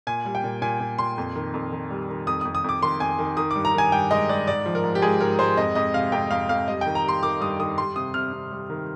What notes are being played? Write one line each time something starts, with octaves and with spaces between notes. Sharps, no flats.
A#2 G#5
G3
G5
A#2
A#2 G#5
A#2
A#2 C6
F2
D#3
F2
D#3
G3
D#3
F2 D#6
F2 D#6
D#6
F2 D6
D#3 C6
F2 G#5
D#3
D#3 D#6
G2 D6
A#5
D#3 G#5
G2 G5
G#3 D#5
G#3 D5
G#2 D5
F3
A#4
G#2
G4
G#3 G#4
G#2 A#4
G#3 C5
F2 D#5
F2 D#5
C3 F5
F2 G5
F2 F5
F2 F5
G3 D#5
D#3 G5
A#5
G3 C6
D#3 D6
G2 D#6
D#3 D#6
G3 C6
C3 D#6
C3 F6
C3
G3
D#3